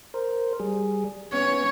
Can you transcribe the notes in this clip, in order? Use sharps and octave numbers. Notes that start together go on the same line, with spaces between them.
A#4 C5
G3 G#4
B3 C#4 C#5